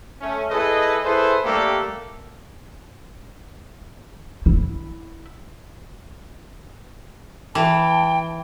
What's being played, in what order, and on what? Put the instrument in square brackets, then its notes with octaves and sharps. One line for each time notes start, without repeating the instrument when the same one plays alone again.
[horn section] A3 C#4
E4 G#4 A4 B4 D#5
E4 G#4 A4 B4 C5
G3 A3 A#3 D4 G4 A4
[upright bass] E4
[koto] E3 [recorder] G5 [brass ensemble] A5